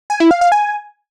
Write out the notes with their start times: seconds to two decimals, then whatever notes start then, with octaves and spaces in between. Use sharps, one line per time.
0.10 G#5
0.20 E4
0.31 F5
0.41 F5
0.52 G#5